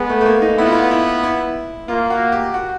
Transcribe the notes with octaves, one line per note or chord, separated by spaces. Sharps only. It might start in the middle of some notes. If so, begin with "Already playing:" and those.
Already playing: G#3 B3
A3
A3
A#3
D#4
B3 E4
F4
E4
E4
E4
A#3 F4
F#4
G4
F#4